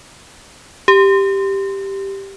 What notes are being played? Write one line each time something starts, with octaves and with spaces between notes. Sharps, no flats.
G4